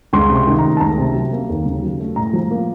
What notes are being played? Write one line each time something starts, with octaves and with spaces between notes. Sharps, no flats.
C#2 C6
C3
C6
D#3
A#5
A3
A5
C#2 A#5
C3
F#3
A#3
D#2
C#3
F#3
A3
A2 A#5
F3
A#3